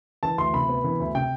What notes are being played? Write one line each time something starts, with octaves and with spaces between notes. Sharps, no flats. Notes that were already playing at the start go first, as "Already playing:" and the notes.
E3 A5
D2 C6
C3 B5
B3
E3
D2
C3 G5